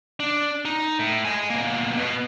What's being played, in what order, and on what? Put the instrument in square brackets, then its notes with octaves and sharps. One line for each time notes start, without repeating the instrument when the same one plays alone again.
[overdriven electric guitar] D4
D#4
A2
D#5 G#5
B2 A#3
B2 B3